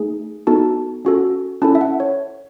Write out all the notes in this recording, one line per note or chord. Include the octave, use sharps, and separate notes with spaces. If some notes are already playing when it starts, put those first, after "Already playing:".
Already playing: A3 D#4 G#4
B3 D#4 F#4 A4 A5
C#4 F#4 A4
C#4 E4 A4 A5
E5
F#5
C#5